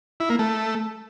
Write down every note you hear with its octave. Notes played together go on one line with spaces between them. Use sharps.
E4
A#3
A3